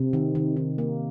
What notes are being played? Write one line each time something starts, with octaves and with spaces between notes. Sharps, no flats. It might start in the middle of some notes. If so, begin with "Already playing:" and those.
Already playing: C3
D#3
D#3
D#3
A#3